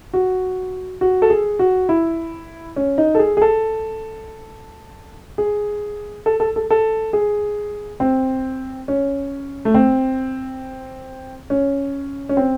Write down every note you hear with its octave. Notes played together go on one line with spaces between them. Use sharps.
F#4
F#4
A4
G#4
F#4
E4
C#4
D#4
A4
G#4
G#4
A4
G#4
A4
A4
A4
A4
G#4
C4
C#4
A3
C4
C#4
C#4
C4